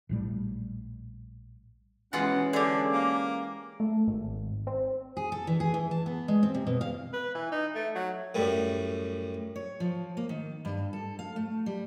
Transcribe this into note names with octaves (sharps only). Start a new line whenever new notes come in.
A#1 A2 G3
B2 E3 G#3 C#4 F4 F#5
D3 G4 G#4
A#3
A3
G#1
C4
G#4
A4
E3
G#4
E3
A5
B3
G#3
C4
C3
B2
F5
B4
E3
D#4
A3
F#3
F#2 A2 G3
C#5
F3
A#3
D#3
G2
A4
F5
A3
G3